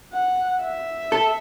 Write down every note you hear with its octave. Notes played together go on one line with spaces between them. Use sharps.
F#5
E5
A4